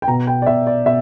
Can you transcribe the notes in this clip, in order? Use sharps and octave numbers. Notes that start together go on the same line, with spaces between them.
G5
B2 A#5
G5
D5
B2 E5
D5
B2 E5